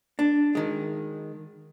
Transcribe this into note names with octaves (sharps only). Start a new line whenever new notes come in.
D4
D#3 G#3